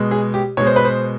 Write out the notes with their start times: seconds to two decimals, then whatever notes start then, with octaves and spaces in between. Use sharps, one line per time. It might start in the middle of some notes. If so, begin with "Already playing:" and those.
Already playing: B2 G#3
0.11 G#4
0.34 G4
0.57 B2 G#3 C#5
0.67 C5
0.76 B4
0.85 C5